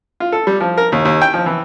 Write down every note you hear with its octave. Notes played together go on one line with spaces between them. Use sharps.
F4
A4
G3
F3
A#4
D#2
D#2
G5
F3
E3